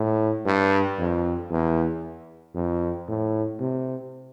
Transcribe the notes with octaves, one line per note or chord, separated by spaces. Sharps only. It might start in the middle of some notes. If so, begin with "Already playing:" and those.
Already playing: A2
G2
F2
E2
F2
A2
C3